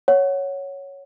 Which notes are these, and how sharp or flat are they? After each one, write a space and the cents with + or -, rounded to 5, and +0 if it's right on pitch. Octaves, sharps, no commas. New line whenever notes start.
C#5 +0 F#5 -5